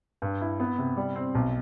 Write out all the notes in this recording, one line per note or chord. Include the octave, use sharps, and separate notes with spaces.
G2
E4
B3
C3
G3
C4
B1